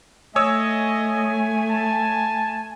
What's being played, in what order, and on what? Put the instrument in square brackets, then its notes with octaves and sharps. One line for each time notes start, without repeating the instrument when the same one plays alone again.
[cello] A3 [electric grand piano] C#5 D#6 E6 [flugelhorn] D#5 [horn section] G#5
[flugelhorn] A5